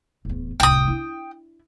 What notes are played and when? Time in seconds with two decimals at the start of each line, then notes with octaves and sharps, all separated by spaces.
0.25 D1 E2
0.60 D1 C2 G5 D#6
0.88 D4 E4